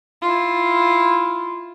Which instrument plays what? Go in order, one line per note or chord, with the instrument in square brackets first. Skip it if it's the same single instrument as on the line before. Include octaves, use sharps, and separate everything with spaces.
[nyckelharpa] E4 F4